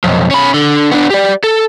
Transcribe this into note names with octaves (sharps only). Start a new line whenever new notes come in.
B1 F2
C#4 B5
D3
B3 D4
G4 D5
A4